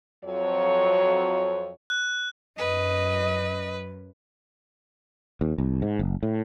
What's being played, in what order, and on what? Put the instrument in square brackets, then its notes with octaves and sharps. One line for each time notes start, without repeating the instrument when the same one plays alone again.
[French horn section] F2 F#3 C#5
[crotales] F#6
[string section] F#2 [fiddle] B4 [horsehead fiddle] D#5
[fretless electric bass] D#2
C2
G#2
F#1
A2